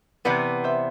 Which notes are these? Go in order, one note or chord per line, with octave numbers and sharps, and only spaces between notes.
C3 E3 B3 B4 D5
C5 E5